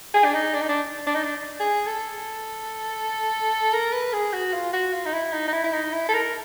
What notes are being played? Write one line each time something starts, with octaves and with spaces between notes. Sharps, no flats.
G#4
D4
D#4
D4
D#4
D4
D4
D#4
D4
G#4
A4
A#4
B4
G#4
F#4
F4
F#4
F4
D#4
E4
D#4
D#4
E4
E4
D#4
E4
A4
A#4